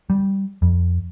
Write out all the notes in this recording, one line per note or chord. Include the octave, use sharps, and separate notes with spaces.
G3
F2